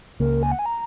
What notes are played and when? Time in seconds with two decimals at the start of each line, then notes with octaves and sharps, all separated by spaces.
0.20 C#2 C#3 A#3 A#4
0.43 G#5
0.52 F#5
0.59 G#5
0.66 A#5